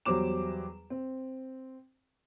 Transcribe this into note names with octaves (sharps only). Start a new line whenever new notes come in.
E2 F#3 G3 C5 D6 E7
C4